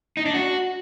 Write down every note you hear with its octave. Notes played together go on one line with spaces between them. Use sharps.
D#4
D4
F#4